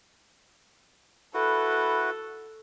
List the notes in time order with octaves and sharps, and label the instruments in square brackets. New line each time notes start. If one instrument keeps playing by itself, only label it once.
[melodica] E4 F#4 B4 [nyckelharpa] A4